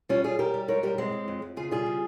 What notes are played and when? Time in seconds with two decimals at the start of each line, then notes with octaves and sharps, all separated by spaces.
0.09 G3 C#4 F4
0.24 G3 F4 G#4
0.39 G3 G4 A#4
0.54 G3
0.68 G#2 A#4 C#5
0.83 G3 G4 A#4
0.98 G#2 G#3 C4
1.12 G#2
1.28 F2
1.42 F2
1.57 C#3 F4 G#4
1.71 G3 F4 G#4
1.86 C#3